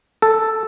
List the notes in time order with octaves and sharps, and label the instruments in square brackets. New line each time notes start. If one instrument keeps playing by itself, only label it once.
[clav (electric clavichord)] A4